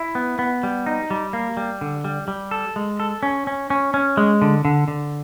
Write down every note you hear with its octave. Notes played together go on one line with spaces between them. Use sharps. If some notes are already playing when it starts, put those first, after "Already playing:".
Already playing: E4
B3
B3
G3
D#4
G3
A#3
G3
D3
G3
G3
A4
G#3
A4
C#4
C#4
C#4
C#4
G#3
D3
D3
D3